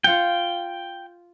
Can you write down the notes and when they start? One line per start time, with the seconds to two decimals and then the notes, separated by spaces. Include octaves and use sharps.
0.04 F4 F#5 G5